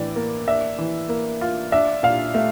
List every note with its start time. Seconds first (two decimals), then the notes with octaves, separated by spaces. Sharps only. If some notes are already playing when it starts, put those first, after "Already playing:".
Already playing: A2 E3 D5
0.16 A#3
0.48 D4 E5
0.78 E3
1.09 A#3
1.41 F4
1.72 D4 E5
2.03 A#2 F5
2.34 A3 E5